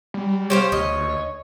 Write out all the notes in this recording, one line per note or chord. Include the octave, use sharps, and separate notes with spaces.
G3
G4 C5 C#5 F5
D2 D#5